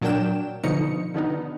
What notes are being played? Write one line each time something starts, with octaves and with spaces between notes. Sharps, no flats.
A#2 F#3 D4 A#4 G5 E7
B2 D3 F3 D#4 C#7
D3 D#3 B3 D#4